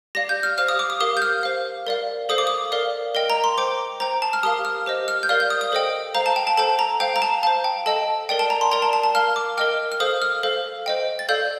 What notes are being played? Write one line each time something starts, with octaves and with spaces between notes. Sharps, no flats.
G4 D5 F5 A#6
G6
F6
G4 C5 F5 F6
D#6
D6
D#6
G4 A#4 F5 D#6
G6
F6
C5 F5
A#4 D5 F5
A4 C5 F5 D#6
D6
D#6
A#4 D5 F5
A#4 D#5 G5
A#5
C6
C5 G5 D6
C5 G5 A#5
A5
F6
G4 A#4 F5 D#6
F6
G4 C5 D#5
F6
G6
A#4 D5 F5 F6
G6
D#6
D#6
A4 C5 D#5 G5
C5 F5 A#5
A5
G5
A5
A4 C5 G5 A5
A#5
C5 F5 G5
A#5
A5
C5 F5 A5
G5
A4 D#5 G5 A5
A#4 D5 G5
A5
A#5
C6
A#4 D5 G5 A#5
A5
A5
A5
A#4 F5 F6
D6
A#4 D#5 G5 F6
F6
A4 C5 F5 D#6
F6
A4 C5 F5
C5 D#5 G5
A6
A4 D5 F5 G6